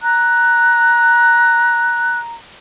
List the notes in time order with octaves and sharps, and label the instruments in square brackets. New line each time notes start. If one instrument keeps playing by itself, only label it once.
[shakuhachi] A#5 [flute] F#6